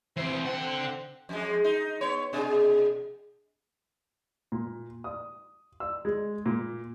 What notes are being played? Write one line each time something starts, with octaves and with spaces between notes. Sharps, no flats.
E3 C4 C5
D3 C4 F#5
F2 G#3
D#4
B3 C#5
B2 D4 G#4
A#2
D#6
E6
G#3
A#2